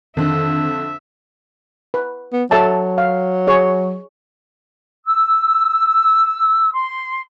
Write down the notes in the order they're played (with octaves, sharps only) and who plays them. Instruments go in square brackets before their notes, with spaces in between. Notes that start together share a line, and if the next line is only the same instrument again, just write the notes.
[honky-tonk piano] F2 D3 [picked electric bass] D#3 [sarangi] E5
[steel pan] B4
[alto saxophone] B3
[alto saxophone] F#3 [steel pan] A4 E5 A5
[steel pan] F5
G#4 C#5
[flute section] E6
C6